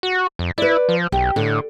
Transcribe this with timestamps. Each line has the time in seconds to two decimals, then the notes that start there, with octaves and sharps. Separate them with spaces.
0.03 F#4
0.39 F2
0.58 E4 B4 D5
0.89 F3
1.12 B1 G4
1.36 A2 D3